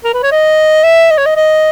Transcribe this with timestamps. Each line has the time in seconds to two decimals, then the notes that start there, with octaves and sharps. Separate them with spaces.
0.04 A#4
0.14 B4
0.23 C#5
0.32 D#5
0.84 E5
1.11 D#5
1.17 C#5
1.26 D#5
1.36 D#5